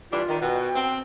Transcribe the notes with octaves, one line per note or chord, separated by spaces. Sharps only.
E3 G3 D4 F4
D#3
B2 G5
C4